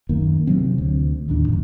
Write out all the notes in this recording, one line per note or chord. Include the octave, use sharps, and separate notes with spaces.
F#2 D#3 A#3
C3 F#3 C4
D2
A1 D#2 D4
F#2 A2